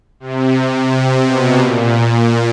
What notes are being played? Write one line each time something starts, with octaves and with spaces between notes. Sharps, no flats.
C3
C3
B2
A#2